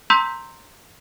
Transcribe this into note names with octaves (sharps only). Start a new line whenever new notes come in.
A#5 C6 E6 G6 B6